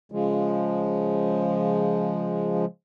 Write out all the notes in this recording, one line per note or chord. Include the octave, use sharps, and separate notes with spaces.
C#3 F3 G#3